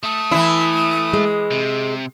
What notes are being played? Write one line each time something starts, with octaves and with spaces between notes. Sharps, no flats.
A3 A4 D#6
E3 E4
G#3
C3